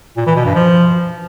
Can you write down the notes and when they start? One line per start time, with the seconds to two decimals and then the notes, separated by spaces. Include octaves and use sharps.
0.17 A#2
0.26 E3
0.36 B2
0.45 G2
0.55 F3